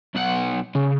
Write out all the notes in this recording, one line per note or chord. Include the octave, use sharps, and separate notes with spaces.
B1 F#5
C#3